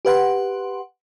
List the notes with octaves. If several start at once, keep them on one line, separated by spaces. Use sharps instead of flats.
G4 B4 F#5 C6